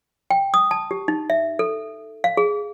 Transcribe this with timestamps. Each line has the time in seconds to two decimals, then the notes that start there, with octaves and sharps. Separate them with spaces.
0.31 G5
0.54 D#6
0.71 A5
0.91 G4
1.08 D#4
1.30 E5
1.59 A4
2.24 F5
2.37 G#4